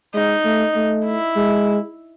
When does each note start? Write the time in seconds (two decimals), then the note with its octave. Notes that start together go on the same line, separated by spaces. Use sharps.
0.14 G#3 D#4
0.45 A3
0.76 A3
1.05 E4
1.36 G#3